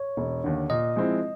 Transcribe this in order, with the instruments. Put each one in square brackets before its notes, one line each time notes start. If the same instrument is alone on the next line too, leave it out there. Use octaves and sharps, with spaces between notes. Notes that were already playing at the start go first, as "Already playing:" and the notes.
Already playing: [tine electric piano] C#5
[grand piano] E1
D#2 D3
[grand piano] A#2 [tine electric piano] D#5
[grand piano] F3 G#3 C4 E4